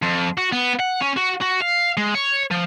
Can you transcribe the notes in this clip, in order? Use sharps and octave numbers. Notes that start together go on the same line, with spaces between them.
F2
F#4
B3
F#5
C#4
F#4
F#4
F5
G#3
C#5
F3